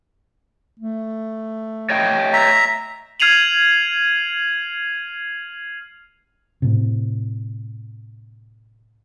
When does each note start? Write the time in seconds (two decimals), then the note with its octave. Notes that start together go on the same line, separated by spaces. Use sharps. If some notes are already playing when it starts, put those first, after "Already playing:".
0.79 A3
1.90 C#5 D#5 G5
2.33 E5 A#5
3.20 F6 G#6 C7 D#7 F7 F#7
6.62 A2 C3